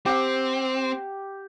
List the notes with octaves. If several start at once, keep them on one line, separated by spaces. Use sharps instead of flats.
C4 G4 F#5